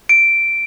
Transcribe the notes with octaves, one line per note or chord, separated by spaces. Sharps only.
D7